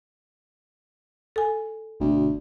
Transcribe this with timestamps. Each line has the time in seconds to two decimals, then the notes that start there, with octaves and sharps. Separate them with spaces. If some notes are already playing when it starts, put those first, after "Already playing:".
1.36 A4 G#5
2.00 G1 D2 B2